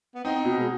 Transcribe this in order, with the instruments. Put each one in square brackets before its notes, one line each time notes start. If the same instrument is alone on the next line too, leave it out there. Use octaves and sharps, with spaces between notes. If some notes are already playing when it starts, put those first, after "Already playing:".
[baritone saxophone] B3
[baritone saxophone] C4 [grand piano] D#4
[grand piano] B2
[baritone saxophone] G#3